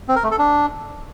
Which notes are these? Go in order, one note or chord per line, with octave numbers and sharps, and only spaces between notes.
C4
A#4
A3
A4
D4